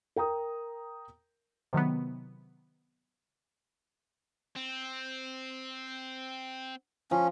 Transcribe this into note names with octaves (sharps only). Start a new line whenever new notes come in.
A#4 G5 A#5 D#6
C3 D#3 F#3 B3
C4
F3 C#4